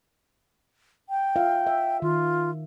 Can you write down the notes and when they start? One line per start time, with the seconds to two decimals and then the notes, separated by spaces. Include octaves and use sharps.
1.09 G5
1.36 F4 E5 F5
1.67 E5
2.02 D#3 F4